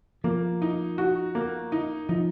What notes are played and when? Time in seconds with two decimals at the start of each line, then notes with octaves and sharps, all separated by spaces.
0.24 F3 A#3
0.62 D#4
0.98 F#4
1.35 A#3
1.72 D#4
2.09 F3 D#4